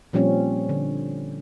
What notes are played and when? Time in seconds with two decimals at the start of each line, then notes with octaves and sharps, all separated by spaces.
0.13 A#2 F3 G3 C4 C#4
0.69 D3